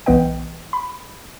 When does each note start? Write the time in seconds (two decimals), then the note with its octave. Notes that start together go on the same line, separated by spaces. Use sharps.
0.06 B1 E3 B3 B4 D#5 G5
0.73 B5